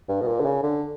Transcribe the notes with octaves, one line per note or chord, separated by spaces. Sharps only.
G2
B2
A#2
D3
C#3
D3